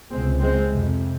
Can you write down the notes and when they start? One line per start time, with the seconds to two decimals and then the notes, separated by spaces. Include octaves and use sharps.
0.12 C#2 C3 G#3 C4
0.41 G#3 C4
0.70 F2 C3